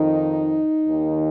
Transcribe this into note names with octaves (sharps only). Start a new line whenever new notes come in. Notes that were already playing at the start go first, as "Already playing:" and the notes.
Already playing: F2 D#3 D#4
D#2 D#3